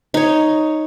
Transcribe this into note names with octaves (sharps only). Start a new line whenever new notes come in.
D#4 C#5